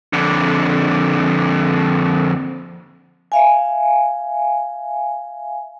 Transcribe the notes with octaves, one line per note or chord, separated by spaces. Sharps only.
F2 D3
E5 F5 G#5